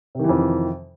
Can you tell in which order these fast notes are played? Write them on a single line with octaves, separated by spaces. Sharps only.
C3 D#3 E3 F2